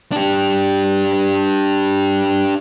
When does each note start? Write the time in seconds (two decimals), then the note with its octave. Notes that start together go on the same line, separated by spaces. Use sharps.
0.12 D4 G4